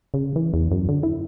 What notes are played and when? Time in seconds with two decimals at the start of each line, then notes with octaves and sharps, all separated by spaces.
0.14 C#3
0.36 E3
0.54 E2
0.71 F#2
0.89 D3
1.03 E4